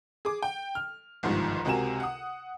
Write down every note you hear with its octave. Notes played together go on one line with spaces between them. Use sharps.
G#4 D6
G5
F6
G1 C2 G#2 D#3 F3
C#2 C3 F#4 A#4 G#5 E7
F#5 D#6